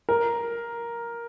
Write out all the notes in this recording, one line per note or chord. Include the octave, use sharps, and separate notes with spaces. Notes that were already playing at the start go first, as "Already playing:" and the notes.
A#4